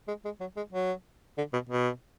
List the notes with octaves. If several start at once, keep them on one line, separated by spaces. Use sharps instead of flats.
G#3
G#3
F#3
G#3
F#3
D3
B2
B2